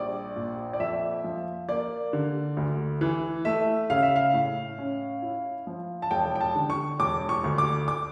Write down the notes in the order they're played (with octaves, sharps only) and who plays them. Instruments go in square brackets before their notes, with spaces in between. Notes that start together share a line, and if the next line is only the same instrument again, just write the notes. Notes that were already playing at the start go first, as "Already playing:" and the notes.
Already playing: [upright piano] A#1 G3 D5
A#2
D5
F2 E5
F3
A#3 D5
D3
D2
E3
A3 E5
C#3 F5
E5
F5
A2
C#4
E4
F3
A5
E1 G5
G5
A5
D3
C#6
E1 D6
C#6
D2
D6
D6